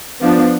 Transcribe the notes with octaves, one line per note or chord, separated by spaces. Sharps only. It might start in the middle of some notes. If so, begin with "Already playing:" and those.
F3 B3 D4